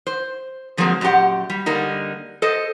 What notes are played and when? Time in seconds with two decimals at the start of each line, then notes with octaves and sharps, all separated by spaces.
0.07 C5
0.77 D3 F3 F#3 G#3 A#3 C4
1.01 F#2 A#2 F4 G4 F#5
1.50 G3
1.66 D3 G3 A#3 D#4
2.42 A4 C5 D#5